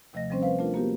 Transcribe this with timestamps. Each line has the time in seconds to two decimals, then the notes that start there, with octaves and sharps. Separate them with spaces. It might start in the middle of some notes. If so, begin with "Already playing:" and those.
0.13 D#2 C3 F3 A3 D#5 A#6
0.30 F3 G3 C4 C#4 C5
0.42 B4 C5 F5
0.59 A3 D4 F4 A#4
0.74 A#3 B3 F#4 G4 A#4